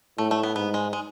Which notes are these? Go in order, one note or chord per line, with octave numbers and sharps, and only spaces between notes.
A2 A3
A3
B3
G#2 B3
G#3
G#3